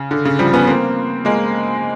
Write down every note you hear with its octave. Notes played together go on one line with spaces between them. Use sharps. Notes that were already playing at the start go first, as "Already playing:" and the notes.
Already playing: C#3
D3
C#3
F3 G3
B3 C#4
A#3 C4
G#3 A#3